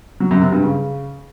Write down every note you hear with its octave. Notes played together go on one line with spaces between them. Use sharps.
F#3
F#2
C3
G2
C#3